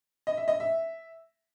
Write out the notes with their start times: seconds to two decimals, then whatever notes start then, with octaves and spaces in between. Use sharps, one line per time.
0.27 D#5
0.37 E5
0.48 D#5
0.60 E5